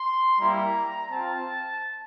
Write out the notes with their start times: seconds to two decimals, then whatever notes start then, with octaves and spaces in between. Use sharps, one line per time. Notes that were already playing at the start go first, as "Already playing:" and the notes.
Already playing: C6
0.39 G3 A#3 E4 A#5
1.11 C4 F4 A5